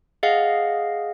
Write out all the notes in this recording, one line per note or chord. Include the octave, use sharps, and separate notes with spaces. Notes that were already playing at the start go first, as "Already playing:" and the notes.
G#4 D#5 F5 F#5